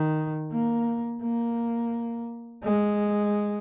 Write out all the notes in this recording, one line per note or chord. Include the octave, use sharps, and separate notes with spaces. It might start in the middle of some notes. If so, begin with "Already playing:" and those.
Already playing: D#3
A#3
A#3
G#3